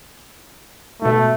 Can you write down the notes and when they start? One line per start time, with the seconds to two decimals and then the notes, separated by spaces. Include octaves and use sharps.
1.02 G#2 B2 A3